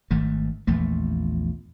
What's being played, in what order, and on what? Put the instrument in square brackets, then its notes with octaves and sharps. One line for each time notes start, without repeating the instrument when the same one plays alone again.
[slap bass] G#1 G#2 D#3 A3
A#1 E2 A#2 A3